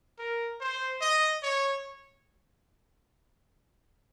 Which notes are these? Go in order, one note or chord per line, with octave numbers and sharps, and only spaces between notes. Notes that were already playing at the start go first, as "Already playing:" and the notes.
A#4
C5
D#5
C#5